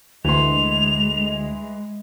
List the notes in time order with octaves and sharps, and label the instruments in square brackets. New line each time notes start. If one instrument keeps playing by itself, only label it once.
[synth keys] D2 [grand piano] E3 C6 [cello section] G#3 [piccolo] F7